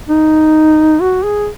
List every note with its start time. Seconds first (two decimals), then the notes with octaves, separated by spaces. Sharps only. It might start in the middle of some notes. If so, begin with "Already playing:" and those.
0.08 D#4
1.01 F#4
1.24 G#4